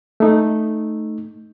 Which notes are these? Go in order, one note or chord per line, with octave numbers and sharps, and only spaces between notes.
A3 D#4